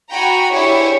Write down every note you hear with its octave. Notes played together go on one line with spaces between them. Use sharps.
F#4 G5 G#5 A#5 B5
D4 E4 G4 G#4 C#5 E5